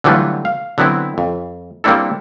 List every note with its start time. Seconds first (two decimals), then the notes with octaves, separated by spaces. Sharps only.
0.04 D3 E3 F#3 G3 A3 F4
0.45 F5
0.78 D3 F#3 B3 C4 E4
1.18 F2
1.84 G3 A#3 C4 D4 E4 A4